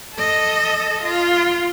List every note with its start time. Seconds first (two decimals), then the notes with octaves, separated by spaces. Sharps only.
0.15 A4 D#5
1.04 F4